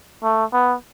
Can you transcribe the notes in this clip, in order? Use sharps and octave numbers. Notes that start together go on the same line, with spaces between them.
A3
B3